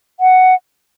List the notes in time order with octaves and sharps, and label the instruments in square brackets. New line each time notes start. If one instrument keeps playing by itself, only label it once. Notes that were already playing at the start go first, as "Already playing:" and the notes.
[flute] F#5